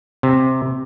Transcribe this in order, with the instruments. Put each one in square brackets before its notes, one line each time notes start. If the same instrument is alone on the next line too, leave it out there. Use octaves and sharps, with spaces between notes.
[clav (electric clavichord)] C3